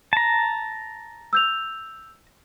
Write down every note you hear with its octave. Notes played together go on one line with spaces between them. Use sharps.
A5 A#5
E6 G6 F7